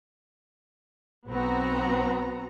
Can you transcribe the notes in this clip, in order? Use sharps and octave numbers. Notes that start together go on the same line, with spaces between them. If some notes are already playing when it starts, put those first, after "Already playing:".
B1 B3 C4 F#4 A#5